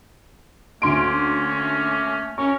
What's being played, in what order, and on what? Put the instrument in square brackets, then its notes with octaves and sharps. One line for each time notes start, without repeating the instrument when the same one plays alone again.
[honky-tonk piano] D2 C6 D7 [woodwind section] A3 A#3 C#4
[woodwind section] C#4 A#4 [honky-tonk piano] C#6